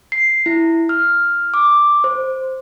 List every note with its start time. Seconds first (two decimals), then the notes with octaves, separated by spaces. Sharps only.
0.12 C7
0.46 E4
0.89 F6
1.54 D6
2.04 C5